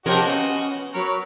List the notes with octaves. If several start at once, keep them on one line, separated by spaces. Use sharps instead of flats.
C3 F3 F#4 G4 A#4 D#5
B3 C#4
F#3 A#4 B4 C#5